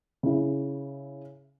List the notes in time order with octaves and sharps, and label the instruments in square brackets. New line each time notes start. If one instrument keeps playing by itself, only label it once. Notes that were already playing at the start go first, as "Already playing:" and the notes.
[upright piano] C#3 E4